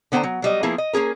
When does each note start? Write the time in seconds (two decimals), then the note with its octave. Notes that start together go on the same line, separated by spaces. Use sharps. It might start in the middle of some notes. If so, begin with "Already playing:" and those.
0.12 D3 B3 C5 D#5 G5 A#5
0.23 F#3
0.42 F#3 G3 D#5
0.63 F3 A#3 B3 E4 G#4
0.78 D#5
0.93 A#3 C#4 G#4 A#4